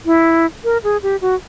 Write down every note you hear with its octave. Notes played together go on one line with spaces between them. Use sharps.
E4
A#4
G#4
G4
F#4